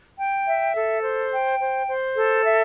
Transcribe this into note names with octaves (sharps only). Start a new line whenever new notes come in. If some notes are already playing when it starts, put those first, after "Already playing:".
G5
E5
A4
C5
G5
C5
C5
A4
E5